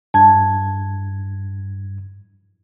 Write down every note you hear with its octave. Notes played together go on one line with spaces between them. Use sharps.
G2 A5 G#6